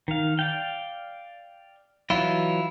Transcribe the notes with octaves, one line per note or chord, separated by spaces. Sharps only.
D#3 F5
D5 F5 G5
E3 F#3 E4 F4 D#5